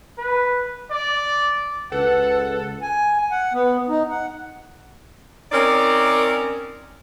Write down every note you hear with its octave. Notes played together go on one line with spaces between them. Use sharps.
B4
D5
C#2 A4 B4 F#5
G#5
F#5
B3
D#4
F#5
C4 C#4 D#4 A#4 C#5 D5